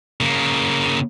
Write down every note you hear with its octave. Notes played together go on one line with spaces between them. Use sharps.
C#3 A#3